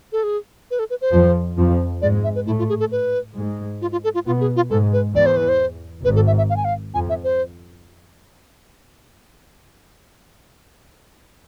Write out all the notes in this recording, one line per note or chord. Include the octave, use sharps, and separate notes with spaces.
A4
G#4
B4
A4
B4
C5
F2 F3
F2 F3
G#2 G#3 D5
E5
B4
A2 A3 E4
F4
G#4
A4
B4
G#2 G#3
F4
F4
A4
F4
B2 B3 F4
G#4
F4
G#2 G#3 A4
B4
E2 E3 D5
C5
B4
C5
G#1 G#2 B4
A4
E5
E5
F5
G#5
F5
F2 G#5
E5
C5